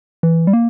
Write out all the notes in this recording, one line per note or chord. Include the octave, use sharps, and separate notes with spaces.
E3
G3
A#3